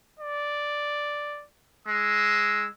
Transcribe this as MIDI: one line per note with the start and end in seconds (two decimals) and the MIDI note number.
0.19 1.45 74
1.87 2.67 56
1.87 2.71 88